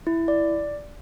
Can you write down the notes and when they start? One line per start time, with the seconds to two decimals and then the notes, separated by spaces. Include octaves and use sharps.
0.07 E4
0.28 D5